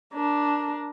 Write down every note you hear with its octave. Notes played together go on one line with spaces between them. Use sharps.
D4 A#4